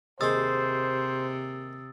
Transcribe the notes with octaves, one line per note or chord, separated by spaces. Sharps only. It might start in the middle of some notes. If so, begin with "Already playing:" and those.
D#2 C3 G#3 C5 C6 D#6 E6 A6